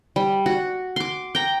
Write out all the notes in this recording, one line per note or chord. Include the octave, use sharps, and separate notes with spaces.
G3
F#4
C6 D6
G5 A#5